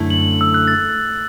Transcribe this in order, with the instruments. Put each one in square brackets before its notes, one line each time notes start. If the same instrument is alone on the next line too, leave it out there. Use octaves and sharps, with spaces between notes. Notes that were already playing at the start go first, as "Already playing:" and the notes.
Already playing: [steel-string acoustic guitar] F#2 D3 A3 E4 A4
[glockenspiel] F#7
E6
F#6
A6